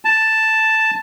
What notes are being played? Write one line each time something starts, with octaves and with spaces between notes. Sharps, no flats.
A5